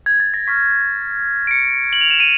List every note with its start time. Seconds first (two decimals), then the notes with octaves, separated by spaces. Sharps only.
0.06 G#6
0.20 A6
0.34 A#6
0.47 C#6 F6 B6
1.47 D7
1.51 C#7
1.93 F#7
2.01 F7
2.11 E7
2.20 D#7